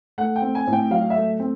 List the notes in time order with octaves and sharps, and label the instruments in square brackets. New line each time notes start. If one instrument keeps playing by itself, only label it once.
[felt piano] A3 [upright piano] F#5
[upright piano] G5
[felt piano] C4
[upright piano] G#5
[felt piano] A2
[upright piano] G5
[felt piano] F#3 [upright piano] F5
[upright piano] E5
[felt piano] A3
C4